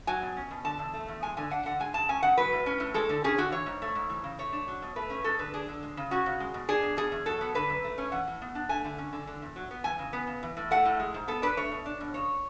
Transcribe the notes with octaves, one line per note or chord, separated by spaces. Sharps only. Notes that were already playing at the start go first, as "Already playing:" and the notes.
F#3 G#5
B2
C#4
B2
D3 A5
E2
A3
E2
G#3 G#5
D3 G#5
D4 F#5
D3 F#5
G#3 G#5
C#3 A5
C#4 G#5
C#3 F#5
F#3 B4
A2
C#4
A2
G#3 A4
D3
C#4 G#4
D3 F#4
E3 C#5
G#2
A3
G#2
E3
C#3
A3 C#5
D4
F#3
B2
A3 B4
C#4
G#3 A4
D3 B4
D4 G#4
D3
G#3
C#3
C#4 F#4
C#3
G#3
B2
D4 G#4
B2
B2 G#4
E2
F#3 A4
B3
D3 B4
F#2
A3
C#4
E3 F#5
A2
B3
D4
A3 G#5
D3
C#4
D3
D3
E2
F#3
B3
E3 G#5
C#3
B3
C#3
E3
A2
A3 F#5
A2
G#3
G#2
B3 A4
D4 B4
A3 C#5
B2
D4
B2
C#3 C#5